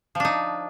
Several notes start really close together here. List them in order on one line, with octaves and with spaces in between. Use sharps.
F3 D4 D#4